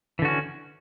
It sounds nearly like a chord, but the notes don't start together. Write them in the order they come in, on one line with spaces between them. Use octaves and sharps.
E3 D3 F#4 C#4